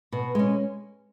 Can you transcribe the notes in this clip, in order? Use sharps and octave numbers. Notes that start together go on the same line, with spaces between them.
B2
G#3 C#4